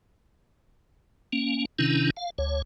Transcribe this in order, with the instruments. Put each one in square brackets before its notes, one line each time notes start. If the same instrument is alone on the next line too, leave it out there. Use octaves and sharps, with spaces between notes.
[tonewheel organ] A#3 C#4
C3 D#3 C#4 D4 E4
F5
D2 C#5